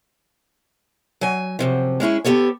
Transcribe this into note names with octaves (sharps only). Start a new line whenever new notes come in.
F#3 G#5
F#2 C3 F3
G#3 C#4 E4 G#4
B3 G4 A4 C#5